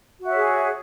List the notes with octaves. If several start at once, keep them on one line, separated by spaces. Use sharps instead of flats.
F#4 G#4 C#5 E5